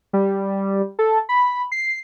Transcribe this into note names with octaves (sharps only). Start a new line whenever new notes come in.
G3
A4
B5
C7